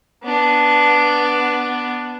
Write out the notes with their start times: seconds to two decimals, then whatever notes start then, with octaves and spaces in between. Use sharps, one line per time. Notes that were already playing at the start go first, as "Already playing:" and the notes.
0.24 B3 D4